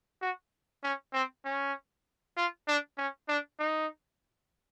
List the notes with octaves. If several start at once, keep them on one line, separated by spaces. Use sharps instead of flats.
F#4
C#4
C4
C#4
F4
D4
C#4
D4
D#4